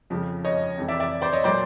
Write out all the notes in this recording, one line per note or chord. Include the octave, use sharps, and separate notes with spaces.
F2 C#3 F3
C#5 D#5
F2 C3 E3
D5 E5
D5 E5
C5 D5
C#5 D#5
A#2 F#3 C5 D5